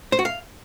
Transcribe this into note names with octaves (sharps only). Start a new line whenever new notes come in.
C5
F#4
F5